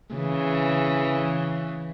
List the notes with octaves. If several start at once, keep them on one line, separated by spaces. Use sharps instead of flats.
C#3 E3